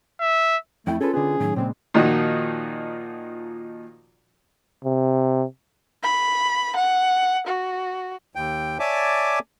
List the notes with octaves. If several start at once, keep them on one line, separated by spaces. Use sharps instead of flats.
E5
F2 A3 E4 G5
C#4 F4 G#4 A4 B4
D3 B3 G#4
A2 D#3 F#3
A#2 C#3 G#3 C4
A#2 D#3 F3 D#4 F#4
C3
B5
F#5
F#4
D#2 G5
C#5 D5 E5 G#5 A5 D6